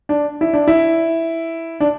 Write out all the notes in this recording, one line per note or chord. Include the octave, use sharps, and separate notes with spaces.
D4
E4
D4
E4
D4